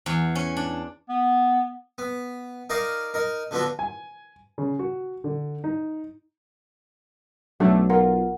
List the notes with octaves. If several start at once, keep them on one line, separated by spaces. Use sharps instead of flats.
E2
C#4
D4
B3
B3
D#4 A#4 D5 D#5 F5
D#4 A#4
D3 F3 B3 D4 F#4
G#5
C#3
F#4
D3
D#4
B1 F#3 A3 D4
F4 A#4 F#5